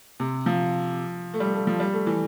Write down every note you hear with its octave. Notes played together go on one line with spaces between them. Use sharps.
C3
F3
A3
G3
A3
F3
G3
A3
E3